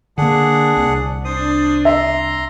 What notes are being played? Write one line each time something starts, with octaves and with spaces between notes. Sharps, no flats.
D3 A#3 D4 G#4 F#5
C2
D4 C5 D#6
E5 A#5 C6